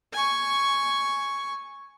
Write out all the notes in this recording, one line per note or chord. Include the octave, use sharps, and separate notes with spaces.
G#5 C#6